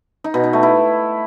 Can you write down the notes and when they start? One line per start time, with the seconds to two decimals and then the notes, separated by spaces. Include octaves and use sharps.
0.24 D#4
0.34 B2
0.44 D#4
0.53 A3
0.63 E4